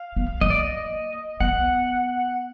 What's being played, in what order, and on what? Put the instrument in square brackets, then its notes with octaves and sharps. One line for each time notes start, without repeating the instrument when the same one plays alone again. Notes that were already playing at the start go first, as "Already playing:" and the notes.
Already playing: [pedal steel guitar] F5
[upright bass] B3
[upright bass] A#3 [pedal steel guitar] D#5
[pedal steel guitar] D5
D#5
[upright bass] B3 [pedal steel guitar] F#5